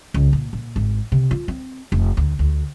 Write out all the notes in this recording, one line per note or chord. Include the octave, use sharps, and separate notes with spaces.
C#2
A#2
A#2
G#1
C3
F4
C4
F1
D2
D2